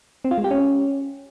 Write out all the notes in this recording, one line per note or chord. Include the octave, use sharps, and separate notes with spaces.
C4
F4
G#3
G4
C#4